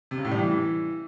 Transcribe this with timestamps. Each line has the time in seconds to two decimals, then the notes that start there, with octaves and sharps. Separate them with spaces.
0.11 C3
0.18 C#3
0.25 A2
0.31 G3
0.38 E3